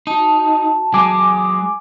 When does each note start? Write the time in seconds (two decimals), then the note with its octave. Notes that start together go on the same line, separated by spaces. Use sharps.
0.07 D#4 F#4 A5
0.94 F#3 G#3 G#5 D6